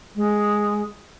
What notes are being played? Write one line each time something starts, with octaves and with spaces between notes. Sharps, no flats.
G#3